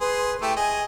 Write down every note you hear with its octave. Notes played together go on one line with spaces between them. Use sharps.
G#4 B4 C6
A3 E4 G4 G5
G#4 D#5 G#5